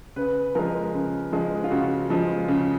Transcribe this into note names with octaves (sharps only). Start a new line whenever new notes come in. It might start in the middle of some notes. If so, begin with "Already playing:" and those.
C#3 B4
F3 G#3 A#4
C#3
F3 G#3
F4
C#3 F#4
F3 G#3
C#3